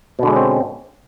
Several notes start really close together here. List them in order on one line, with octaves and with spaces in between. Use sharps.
B2 D3 G#3 C#4 C4